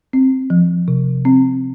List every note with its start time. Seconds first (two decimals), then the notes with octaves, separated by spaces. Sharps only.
0.13 C4
0.50 F3
0.88 C3
1.25 C4